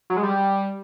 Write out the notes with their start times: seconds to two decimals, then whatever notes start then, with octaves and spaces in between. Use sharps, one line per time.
0.10 F#3
0.16 G#3
0.23 G3